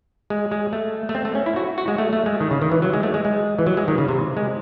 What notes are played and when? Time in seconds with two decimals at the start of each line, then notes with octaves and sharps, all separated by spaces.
0.30 G#3
0.51 G#3
0.73 A3
1.09 A3
1.15 C4
1.25 A3
1.35 C#4
1.46 E4
1.56 F#4
1.78 F#4
1.88 G#3
1.98 A3
2.13 A3
2.26 G#3
2.40 D#3
2.51 C#3
2.62 D#3
2.72 E3
2.82 F#3
2.93 G#3
3.03 A3
3.14 G#3
3.25 G#3
3.59 E3
3.66 F#3
3.77 G#3
3.88 D#3
3.98 C#3
4.08 C3
4.37 G#3